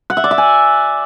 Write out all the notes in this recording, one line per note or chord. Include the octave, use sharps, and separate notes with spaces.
F#5
E5
D5
E5
G#5